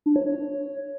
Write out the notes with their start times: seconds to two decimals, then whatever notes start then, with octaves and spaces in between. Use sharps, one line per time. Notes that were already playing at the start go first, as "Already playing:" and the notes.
0.06 D4
0.16 C#5
0.26 C#5